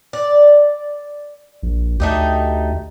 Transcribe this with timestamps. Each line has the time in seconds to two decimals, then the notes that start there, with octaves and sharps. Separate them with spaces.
0.13 D5
1.63 A#1
2.00 D2 A3 D#4 G4